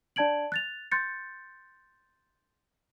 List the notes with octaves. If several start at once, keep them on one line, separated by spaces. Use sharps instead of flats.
D4 D5 A5 G#6 D7 F#7
F#6 A6 F7
C6 F#6 G6 A6 C#7